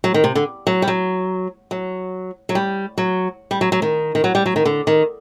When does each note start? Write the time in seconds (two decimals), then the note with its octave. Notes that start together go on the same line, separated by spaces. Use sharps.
0.04 F#3
0.14 D#3
0.24 C3
0.35 D3
0.67 F#3
0.82 G3
0.88 F#3
1.71 F#3
2.49 F#3
2.55 G3
2.98 F#3
3.51 G3
3.61 F#3
3.72 F#3
3.82 D#3
4.15 D#3
4.24 F#3
4.35 G3
4.46 F#3
4.56 D#3
4.65 D3
4.87 D#3